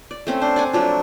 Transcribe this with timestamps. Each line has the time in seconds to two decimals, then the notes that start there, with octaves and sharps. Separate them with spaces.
0.11 D5
0.27 A3 C4 C#4
0.42 D4 C5
0.56 D5 F#5 G#5
0.73 F3 F#3 A3 D4